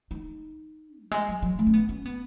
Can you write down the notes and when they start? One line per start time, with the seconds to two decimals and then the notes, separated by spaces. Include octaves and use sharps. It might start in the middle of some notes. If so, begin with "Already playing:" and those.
0.11 D#4
1.03 F#3
1.11 G#3
1.28 F#3
1.42 F#3
1.59 A3
1.67 C#4
1.74 B3
1.89 C#4
2.06 B3